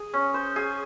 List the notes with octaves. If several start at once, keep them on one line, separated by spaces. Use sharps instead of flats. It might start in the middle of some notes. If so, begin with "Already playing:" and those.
Already playing: G#4
C#4
C5
G#4